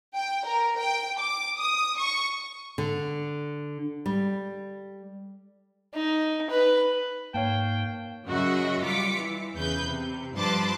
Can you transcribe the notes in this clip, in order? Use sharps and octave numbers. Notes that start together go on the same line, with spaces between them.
G5
A#4
G5
D6
D#6
C#6
D3
G3
D#4
B4
G#2 A#3 C#5 F5 G5 A5
F#2 C#3 F#4 D#5 E5
G3 F4 D6 B6 C#7
E3
E2 C#3 B4 G6
C3
G2 F3 B4 A5 C6 D6